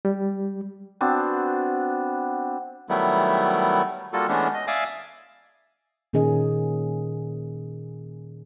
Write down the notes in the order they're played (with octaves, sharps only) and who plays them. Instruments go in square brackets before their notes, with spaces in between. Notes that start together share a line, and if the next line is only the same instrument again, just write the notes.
[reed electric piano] G3
[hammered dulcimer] B3 C4 D4 F#4
[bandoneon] D#3 F#3 G3 A3 B3 E4
G3 A#3 F4 F#4 A4
E3 G#3 A3 B3 C#4 D4
D#5
D5 E5 F5 G#5 D6 D#6
[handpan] A#2 D#3 C#4 G#4 A#4 D#5